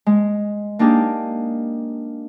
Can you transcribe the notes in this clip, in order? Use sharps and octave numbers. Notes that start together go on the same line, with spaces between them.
G#3
A#3 D4 D#4 G4 G#4